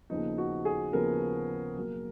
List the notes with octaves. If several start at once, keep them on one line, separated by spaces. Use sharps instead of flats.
D#2 C#3 F3 B3 D#4
F#4
G#4
D#2 C#3 F3 B3 A#4
B2 F#3 A#3